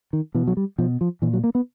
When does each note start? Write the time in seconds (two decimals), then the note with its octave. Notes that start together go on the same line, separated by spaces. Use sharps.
0.13 D#3
0.35 B2 E3
0.47 F#3
0.57 G3
0.78 B2 F3
1.01 F3
1.22 A#2 E3
1.33 F#3
1.44 A#3
1.55 B3